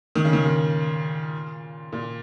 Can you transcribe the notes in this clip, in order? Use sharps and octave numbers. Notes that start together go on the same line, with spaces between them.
D#3
C#3
D#3
A#2
A#2